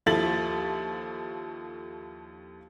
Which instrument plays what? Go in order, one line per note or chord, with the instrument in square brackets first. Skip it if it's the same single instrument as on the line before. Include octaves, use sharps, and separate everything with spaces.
[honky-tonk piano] D#2 F3 E4 A4 A6 F#7